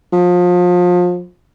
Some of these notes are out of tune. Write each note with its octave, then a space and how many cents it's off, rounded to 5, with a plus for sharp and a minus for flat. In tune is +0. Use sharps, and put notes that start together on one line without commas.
F3 +30